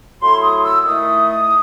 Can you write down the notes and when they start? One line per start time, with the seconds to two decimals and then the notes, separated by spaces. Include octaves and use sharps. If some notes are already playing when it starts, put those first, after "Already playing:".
0.21 F#3 A3 E4 C6
0.42 D#6
0.64 E6
0.85 D#3 A3 E4 D#6